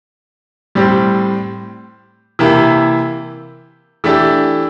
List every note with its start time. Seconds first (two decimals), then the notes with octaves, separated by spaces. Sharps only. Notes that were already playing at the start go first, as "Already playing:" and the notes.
0.75 A2 G3 C4 G4
2.39 C3 E3 A#3 E4 G4
4.04 E3 A3 D4 G4